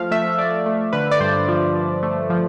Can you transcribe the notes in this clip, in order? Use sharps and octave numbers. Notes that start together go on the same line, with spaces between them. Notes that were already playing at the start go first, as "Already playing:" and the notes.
Already playing: F3 A3 F5
A3 E5
A3 D5
A3
D3 B4
D5
G2 C5
F3
F3
A3
F3